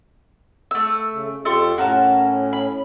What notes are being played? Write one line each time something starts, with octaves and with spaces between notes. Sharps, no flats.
A3 E6
C#3
F2 F4 G4 A4 C6 C#6
A2 C#4 F#4 A#4 A5
B5